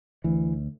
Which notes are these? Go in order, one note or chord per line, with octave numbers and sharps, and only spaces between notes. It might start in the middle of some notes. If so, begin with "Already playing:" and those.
D2 E3